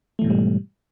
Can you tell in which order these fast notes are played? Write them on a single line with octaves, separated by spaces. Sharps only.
A3 E3 B2 G#2 G3